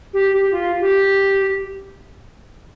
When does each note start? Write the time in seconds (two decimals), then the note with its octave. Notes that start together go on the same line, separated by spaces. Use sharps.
0.13 G4
0.33 G4
0.51 F4
0.80 G4